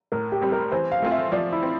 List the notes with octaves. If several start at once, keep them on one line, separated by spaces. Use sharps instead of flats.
A2 A#4
G4
G3 C4
A#4
E3 C5
F5
A3 C4 F4
E5
F3 D5
E4
C4